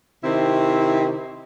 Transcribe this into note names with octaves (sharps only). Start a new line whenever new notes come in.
C3 D#3 C4 E4